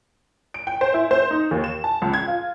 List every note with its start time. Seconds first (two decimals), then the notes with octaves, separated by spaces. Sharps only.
0.54 D7
0.67 G5
0.81 C5
0.94 E4
1.11 C5
1.31 D#4
1.51 D#2
1.64 E7
1.84 A5
2.02 C#2
2.14 G#6
2.28 F4